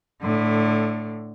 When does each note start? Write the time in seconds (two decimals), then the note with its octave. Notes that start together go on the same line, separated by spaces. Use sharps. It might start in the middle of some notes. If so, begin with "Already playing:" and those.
0.22 A2 D3